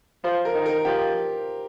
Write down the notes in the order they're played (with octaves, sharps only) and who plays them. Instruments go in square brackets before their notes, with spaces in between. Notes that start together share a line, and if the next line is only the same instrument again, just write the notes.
[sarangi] F3 [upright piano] C5
[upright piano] A#4
[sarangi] D#3
[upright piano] A#4
[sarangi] F3 [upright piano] G4